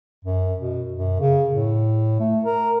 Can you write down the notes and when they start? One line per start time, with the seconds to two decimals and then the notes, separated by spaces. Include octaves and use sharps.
0.24 F#2
0.60 B2
0.94 F#2
1.20 C#3
1.50 A2
2.20 A3
2.45 A#4